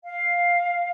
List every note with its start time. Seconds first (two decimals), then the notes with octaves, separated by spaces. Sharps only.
0.04 F5